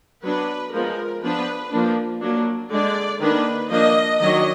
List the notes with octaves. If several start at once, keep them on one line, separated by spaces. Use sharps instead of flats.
F#3 B3 D4 B4
F3 G#3 B3 A#4
F3 B3 D4 B4
F3 A#3 D4
F#3 A#3 D4
D3 G#3 D4 D5
D#3 A#3 D4 B4
F3 A#3 D4 D#5
D#3 F#3 D4 D#5